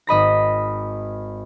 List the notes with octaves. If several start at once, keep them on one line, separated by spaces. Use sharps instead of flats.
G#1 D#5 B5 A#6